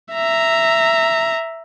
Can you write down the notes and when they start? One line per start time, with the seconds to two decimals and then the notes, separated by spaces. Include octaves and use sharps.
0.13 E5 A#5